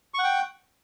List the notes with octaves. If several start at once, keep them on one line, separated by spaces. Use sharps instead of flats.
F#5 G5 C#6